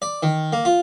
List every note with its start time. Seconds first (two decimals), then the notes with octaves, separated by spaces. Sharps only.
0.02 D5
0.23 D#3
0.53 A#3
0.65 F4